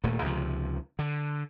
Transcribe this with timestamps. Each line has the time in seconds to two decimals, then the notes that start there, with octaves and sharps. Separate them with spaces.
0.04 D#1 A#2 A3
0.22 C#2 C3 F3
0.99 D3